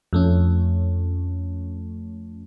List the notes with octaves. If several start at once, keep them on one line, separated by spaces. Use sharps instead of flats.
F2 A3 C#4